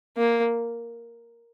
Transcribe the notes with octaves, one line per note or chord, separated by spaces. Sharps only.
A#3